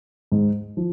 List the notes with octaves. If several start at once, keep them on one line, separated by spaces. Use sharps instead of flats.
G#2
F3